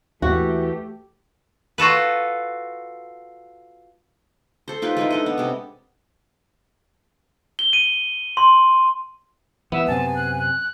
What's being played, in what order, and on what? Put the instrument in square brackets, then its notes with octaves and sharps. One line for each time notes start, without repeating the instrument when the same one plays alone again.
[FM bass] D#2 [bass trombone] E3 [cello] A3 G4 [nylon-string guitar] F#4
[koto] F4 F#4 A4 B4
[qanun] A4 C5
D#4 F4 G4 B4
G#3 D#4 E4
D4 A4 D#5
B3
C3 G#3
[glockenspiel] G7
D#7
C6
[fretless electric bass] E3 G3 [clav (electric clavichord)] B3 [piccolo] E5
[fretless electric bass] F#2 C3 C4 [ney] G#5 [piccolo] A5
[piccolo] F#6
F#6